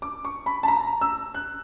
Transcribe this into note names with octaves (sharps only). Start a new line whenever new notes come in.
D6
C#6
B5
A5
A#5
E6
F#6